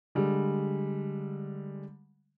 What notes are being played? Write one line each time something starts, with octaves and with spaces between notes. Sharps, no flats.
D3 G3 G#3